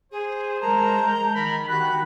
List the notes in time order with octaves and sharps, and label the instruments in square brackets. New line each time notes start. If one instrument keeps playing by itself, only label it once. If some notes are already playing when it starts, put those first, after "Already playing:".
[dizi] G#4 [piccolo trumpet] C5
[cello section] G#3 [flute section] A#4 A5 [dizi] A#5
[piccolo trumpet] G6
[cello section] D#3 [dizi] A#4 [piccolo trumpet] B5
[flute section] F#4 G4 [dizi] B5 [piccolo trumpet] F#6